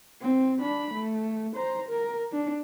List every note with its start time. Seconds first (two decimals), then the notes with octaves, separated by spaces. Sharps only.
0.22 C4
0.60 D4 B5
0.94 A3
1.56 C5 A#5
1.88 A#4
2.32 D4